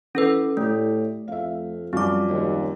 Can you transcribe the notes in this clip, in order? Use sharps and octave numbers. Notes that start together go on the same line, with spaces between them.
E3 C#4 A4 B4
A2 A3 G4
F2 E5 F5
F#2 F3 G3 C4 D6
D#2